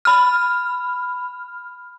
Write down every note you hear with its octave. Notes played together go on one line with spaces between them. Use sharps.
B5 F6